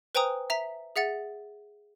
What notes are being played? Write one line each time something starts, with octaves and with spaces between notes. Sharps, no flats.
B4 C5 G5 G#5 A#5 D#6
E5 A#5 B6
G#4 E5 F#5 A6